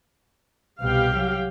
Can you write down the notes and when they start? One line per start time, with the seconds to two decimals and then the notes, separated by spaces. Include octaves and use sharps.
0.81 C2 B2 G4 F5 G5
1.17 F#3